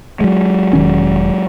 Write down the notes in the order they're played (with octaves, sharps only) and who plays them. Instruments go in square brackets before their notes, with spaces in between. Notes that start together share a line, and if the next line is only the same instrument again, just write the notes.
[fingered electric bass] F#3 G#3
[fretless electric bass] E1 D#3 C#4